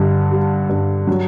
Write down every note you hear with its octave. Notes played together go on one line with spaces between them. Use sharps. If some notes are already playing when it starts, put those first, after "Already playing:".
Already playing: G2 D3
G3
G2
F#3